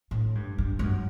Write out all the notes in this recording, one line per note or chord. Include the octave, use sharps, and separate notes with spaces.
A2
G2
G2
G2
F#2